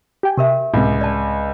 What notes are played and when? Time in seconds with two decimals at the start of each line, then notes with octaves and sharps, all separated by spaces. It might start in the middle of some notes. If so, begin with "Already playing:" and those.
0.23 G4 G5 G#5
0.37 C3 G4 A#4 E5
0.74 C#2 A2 C3
1.01 D5 A5